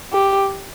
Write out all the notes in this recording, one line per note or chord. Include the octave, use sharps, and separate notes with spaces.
G4